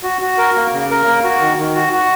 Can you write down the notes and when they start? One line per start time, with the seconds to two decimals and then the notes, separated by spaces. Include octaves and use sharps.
0.03 F#4
0.22 F#4
0.38 A#4
0.55 A#3
0.73 C#3
0.90 A#4
1.06 A#3
1.24 F#4
1.41 D#3
1.58 D#3
1.76 F#4
1.93 F#4